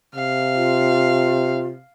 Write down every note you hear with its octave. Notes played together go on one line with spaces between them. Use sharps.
C3 F5
F4